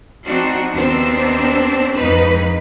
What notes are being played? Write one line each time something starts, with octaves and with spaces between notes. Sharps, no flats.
F3 C4 D4 D#4 F#4
D#2 B3 C4 D4
F2 G#2 D#4 B4